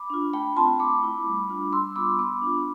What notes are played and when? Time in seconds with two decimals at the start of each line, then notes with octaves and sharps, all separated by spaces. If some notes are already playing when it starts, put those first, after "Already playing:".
Already playing: B5 D6
0.10 D4 F4
0.33 A3 G5 B5
0.56 C4 F4 A5 C6
0.79 A3 B5 D6
1.03 E4
1.26 G3
1.49 D4 F4
1.73 G3 C6 E6
1.95 B3 F4 B5 D6
2.19 B3 B5 D6
2.42 D4 F4